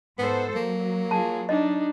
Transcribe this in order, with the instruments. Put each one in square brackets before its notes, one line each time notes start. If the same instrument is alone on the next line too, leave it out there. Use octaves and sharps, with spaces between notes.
[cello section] G#2 A4 C5 [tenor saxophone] B3
[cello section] F#3 [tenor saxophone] A#3
[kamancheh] F4 G#4 [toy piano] A5
[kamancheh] D4 D#4 [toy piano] D#5